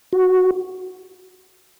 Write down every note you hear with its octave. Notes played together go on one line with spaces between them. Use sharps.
F#4